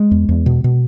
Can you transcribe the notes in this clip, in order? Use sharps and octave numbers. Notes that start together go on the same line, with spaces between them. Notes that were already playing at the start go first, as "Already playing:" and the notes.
Already playing: G#3
E2
E2
B2
B2